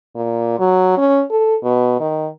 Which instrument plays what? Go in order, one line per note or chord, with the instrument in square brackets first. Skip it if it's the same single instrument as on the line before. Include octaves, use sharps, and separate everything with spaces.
[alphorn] A#2
F#3
C#4
A4
B2
D#3